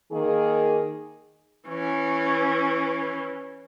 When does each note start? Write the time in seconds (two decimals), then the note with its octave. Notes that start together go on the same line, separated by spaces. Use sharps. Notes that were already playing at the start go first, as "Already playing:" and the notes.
0.12 D#3 A#3 G#4
1.68 E3 C#4